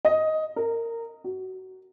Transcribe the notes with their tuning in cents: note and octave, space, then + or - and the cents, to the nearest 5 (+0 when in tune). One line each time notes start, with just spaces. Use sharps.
D#5 +10
A#4 -20
F#4 +20